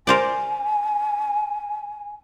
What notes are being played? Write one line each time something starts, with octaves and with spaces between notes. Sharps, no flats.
A#4 C5 D5 G#5